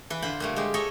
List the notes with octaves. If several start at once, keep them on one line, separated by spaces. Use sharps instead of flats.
E3 E4 B4
D3 F4 C5 B5
A#2 G3 A3
G#3 G4
A4 C#5 D#5 E5 G#5